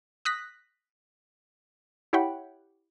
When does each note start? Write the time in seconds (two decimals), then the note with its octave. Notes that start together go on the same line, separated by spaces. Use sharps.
0.25 D#6 F#6 A#6 B6
2.13 E4 G4 C#5 F#5 G5 B5